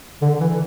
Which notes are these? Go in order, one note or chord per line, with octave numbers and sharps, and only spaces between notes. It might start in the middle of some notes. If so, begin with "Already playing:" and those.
D3
E3